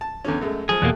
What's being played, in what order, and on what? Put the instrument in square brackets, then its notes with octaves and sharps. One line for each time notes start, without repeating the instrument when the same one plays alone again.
[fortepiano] A5
E2 D3 C#4
F#2 G#3 A3
[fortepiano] F3 G#3 [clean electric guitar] G#4
[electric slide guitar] E2 B2 A#3 [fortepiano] G3 A3 F#6